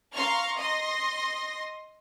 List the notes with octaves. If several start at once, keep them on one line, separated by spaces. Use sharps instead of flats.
F5 A#5 C6 C#6 F6
D#5 C6 A#6